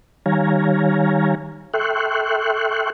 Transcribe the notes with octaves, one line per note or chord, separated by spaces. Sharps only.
D#3 G3 C#5 F5 G#5 A#5
A4 E5 G5 C6 C#6 F#6